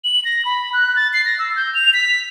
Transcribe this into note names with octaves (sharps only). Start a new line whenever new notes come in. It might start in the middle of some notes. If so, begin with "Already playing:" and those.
F#7
A#6
B5
F#6
A6
C7
A#6
E6
G6
F7
B6